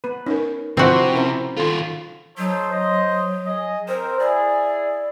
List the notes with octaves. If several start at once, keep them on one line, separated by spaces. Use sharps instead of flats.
B3 B4
C#4 D#4 A#4
C3 F3 C4 E4 F#4 G4 C5
C#4 E4 A#4 C5
D#3 F4 A4 C6
F#3 D#4 A4 C5
C5 D#5
G#4 D#5
C4 A#4 C5
E4 G#4 D5